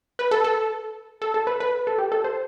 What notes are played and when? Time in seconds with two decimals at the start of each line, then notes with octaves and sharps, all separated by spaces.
0.19 B4
0.31 A4
0.44 A4
1.22 A4
1.34 A4
1.47 B4
1.60 B4
1.87 A4
1.98 G4
2.12 A4
2.24 C5